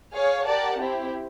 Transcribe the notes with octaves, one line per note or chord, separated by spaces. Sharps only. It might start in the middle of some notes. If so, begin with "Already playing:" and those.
G#4 C#5 F5
G4 A#4 D5 F#5 A5
C4 E4 G4 C5